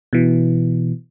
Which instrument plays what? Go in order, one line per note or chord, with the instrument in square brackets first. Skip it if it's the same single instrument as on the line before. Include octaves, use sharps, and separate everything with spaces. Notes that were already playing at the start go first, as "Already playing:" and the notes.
[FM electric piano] B2 E3